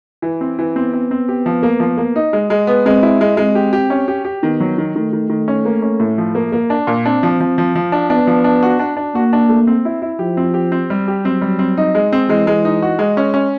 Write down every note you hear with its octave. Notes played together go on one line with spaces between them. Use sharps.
E3
C4
E3
B3 C4
C4
C4
G4
F3
A#3
F3
A#3
D#4
G#3
G#3
B3
G#3 C4
E4
G#3
G#3 C4
G4
G4
C#4
G4
G4
D#3 B3
F#3
D#3
D#3 A3
D#3
D#3
C#4
A#3
C#4
A2
F3
A#3
A#3
D4
A#2
C4 D4
F3
F3
F3
F3
D4
B3 D4
F3
D4
F#4
D4
D4
A#3 F#4
D4
A3
C4
E4
E4
F3 G4
C4
G4
C4
G3
G4
F#3 C4
G3
C4
D#4
G#3
C4
E3 G#3
G#3
D#4
F#4
G#3
C#4
C#4